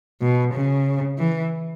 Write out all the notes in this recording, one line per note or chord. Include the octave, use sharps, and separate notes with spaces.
B2
C#3
E3